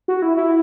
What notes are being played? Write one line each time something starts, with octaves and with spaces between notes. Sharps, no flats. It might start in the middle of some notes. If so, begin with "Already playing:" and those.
F#4
E4
E4